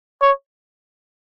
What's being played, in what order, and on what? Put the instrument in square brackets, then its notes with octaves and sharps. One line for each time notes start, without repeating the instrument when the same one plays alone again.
[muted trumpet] C#5